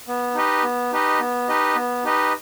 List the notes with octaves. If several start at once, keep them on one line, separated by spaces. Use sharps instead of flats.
B3
D#4 G4 B4 D#5
B3
D#4 G4 B4 D#5
B3
D#4 G4 B4 D#5
B3
D#4 G4 B4 D#5